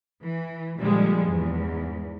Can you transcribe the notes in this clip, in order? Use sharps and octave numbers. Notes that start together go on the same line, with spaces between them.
E3
A#2 D3 F3 G3 G#3
E2 G#2